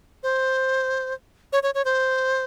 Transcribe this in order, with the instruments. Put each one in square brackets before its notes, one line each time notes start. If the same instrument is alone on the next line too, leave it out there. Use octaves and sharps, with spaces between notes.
[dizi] C5
C#5
C#5
C#5
C5